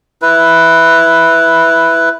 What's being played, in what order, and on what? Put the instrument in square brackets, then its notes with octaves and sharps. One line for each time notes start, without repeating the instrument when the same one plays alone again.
[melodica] E4 B4